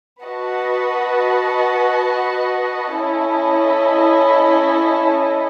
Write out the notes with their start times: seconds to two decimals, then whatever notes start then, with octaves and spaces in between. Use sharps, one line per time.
0.23 F#4 B4 D#5 F#5 A5
2.94 C#4 E4 A4 D#5